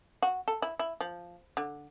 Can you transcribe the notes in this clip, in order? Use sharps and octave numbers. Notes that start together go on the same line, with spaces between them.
F#4
A4
E4
E4
F3
D3